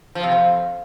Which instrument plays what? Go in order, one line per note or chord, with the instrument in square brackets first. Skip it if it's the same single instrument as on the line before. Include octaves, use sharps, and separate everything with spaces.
[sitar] F3
C3
F2